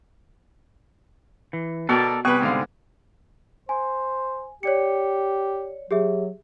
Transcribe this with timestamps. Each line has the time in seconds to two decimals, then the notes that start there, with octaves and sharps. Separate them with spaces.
1.53 E3
1.89 B2 B3 F#4 A4 A#4 D5
2.25 C3 G3 B3 G#4 B4 C#6
2.41 G#2 D3 F5
3.69 C5 G#5
4.63 G4 C#5 D5 C#7
5.91 F#3 G4 G#4 E5